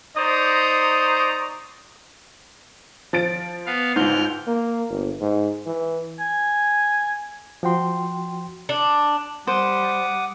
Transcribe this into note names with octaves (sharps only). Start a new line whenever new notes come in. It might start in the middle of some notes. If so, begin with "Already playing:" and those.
D#4 C5 D5 A#5 C#6 D#6
F3 A6 D7
B3 F5
C#2 G#2 F6 G6
A#3
G1
G#2
E3
G#5
F3 F#4 G5 C6
D4
G3 C5 F#5 D6 D#6